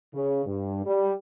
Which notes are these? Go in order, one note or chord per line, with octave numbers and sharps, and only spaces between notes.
C#3
G2
G3